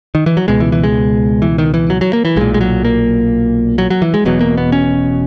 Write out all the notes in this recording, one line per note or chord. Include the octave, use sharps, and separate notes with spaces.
D#3
E3
F#3
C#2 B2 G#3
E3
E3
G#3
E3
D#3
E3
F#3
F#3
A#3
E3
B1 A#2 G#3
G#3
F#3
A#3
F#3
F#3
E3
G#3
E1 E2 B2 F#3
A#3
B3
C#4